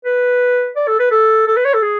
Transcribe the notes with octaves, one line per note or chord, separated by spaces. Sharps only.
B4
D5
A4
B4
A4
A4
B4
C#5
A4
G#4